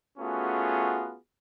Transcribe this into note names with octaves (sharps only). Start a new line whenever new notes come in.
A3 B3 C#4 F4 F#4 G#4